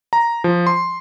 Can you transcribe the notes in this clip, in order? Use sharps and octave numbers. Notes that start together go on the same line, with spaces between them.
A#5
F3
C6